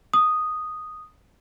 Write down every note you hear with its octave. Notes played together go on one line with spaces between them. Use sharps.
D#6